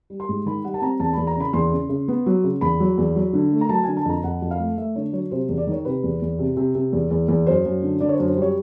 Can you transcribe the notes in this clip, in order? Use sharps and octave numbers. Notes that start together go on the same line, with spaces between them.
G3
C6
G#2
D#3 B5
G3 F#5
A5
C4 A#5
E2 A5
E2 B5
A#5
C#3 B5
E2 C6
C#3
C#3
B3
F#3
C#3
E2 B5
F#3
E2
F#3
D3
A3
A#5
F#3 A5
D3 G#5
A5
F2 A#5
F2 F#5
F2
F5
A3
A3 E5
D3 C#5
F#3 C#5
C3 C5
E2
D5
D#3 C#5
C3 B4
E2
E2
C3
C3
C3
E2
E2
E2
F#2 C5
F#2
D3
D3 D5
C#5
C5
F#2
C5
G3
C#5